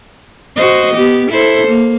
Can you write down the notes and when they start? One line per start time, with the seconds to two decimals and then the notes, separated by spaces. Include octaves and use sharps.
0.56 F#4 C5 D#5
0.94 B3 G4
1.31 E4 A4 C5
1.67 A#3